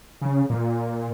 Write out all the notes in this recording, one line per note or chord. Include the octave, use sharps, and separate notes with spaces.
C#3
A#2